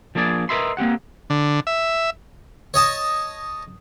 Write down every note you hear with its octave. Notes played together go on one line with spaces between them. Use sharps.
F3 A#3 D4 G#4 D5
A#4 B4 D#5 E5 B5 C6
A#3 C4 G4 F#5
D3
E5
C#5 D#5 A5